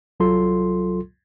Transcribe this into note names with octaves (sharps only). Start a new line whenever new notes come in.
C2 F#3 F4 A4 C6